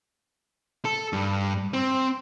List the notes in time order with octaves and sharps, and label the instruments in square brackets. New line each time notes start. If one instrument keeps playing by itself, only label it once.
[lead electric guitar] A4
G2
C4